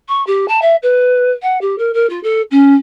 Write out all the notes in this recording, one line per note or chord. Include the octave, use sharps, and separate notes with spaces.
C#6
G4
A5
E5
B4
F#5
G4
A#4
A#4
F4
A4
C#4